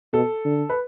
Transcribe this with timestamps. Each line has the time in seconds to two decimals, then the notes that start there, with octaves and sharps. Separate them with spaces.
0.13 B2 A4
0.45 D3
0.69 B4